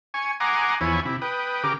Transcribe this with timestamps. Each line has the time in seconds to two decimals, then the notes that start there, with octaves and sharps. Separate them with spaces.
0.14 G#5 C#6
0.40 F#5 G#5 A#5 C6 D6 D#6
0.81 E2 F3 E4 C#5 G#5
1.06 C3 E4
1.22 B4 G5 D#6
1.63 C#3 G4 A#4 D6